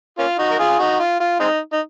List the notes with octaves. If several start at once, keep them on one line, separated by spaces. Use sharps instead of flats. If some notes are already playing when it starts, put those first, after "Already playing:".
A#3 C#4 F4
D#4 F#4
A#4
F4 G#4
D#4 F#4
F4
F4
G#3 C4 D#4
D#4